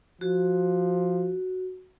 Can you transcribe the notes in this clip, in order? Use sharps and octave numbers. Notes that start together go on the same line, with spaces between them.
F3 F#4